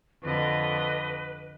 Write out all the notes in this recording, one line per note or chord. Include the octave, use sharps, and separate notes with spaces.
F2 D3 B4 D#5